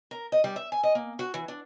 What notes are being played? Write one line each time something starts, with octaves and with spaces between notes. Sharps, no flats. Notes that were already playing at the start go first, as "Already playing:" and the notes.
A#4
D#5
G3
E5
G#5
D#5
A#3
F#4
E3
D4